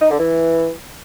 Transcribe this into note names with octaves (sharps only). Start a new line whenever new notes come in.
D#4
D3
E3